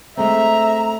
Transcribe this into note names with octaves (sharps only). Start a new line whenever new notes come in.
G#3 A3 C4 E5 A#5